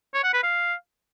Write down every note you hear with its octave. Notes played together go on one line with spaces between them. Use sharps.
C#5
F#5
B4
F5